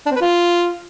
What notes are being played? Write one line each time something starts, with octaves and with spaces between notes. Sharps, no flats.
D4
C4
B4
F4